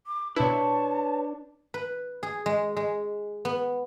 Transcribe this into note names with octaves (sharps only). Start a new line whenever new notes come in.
D6
B2 D4 E4 B4 C#5 A5
B4
G#4
G#3
G#3
B3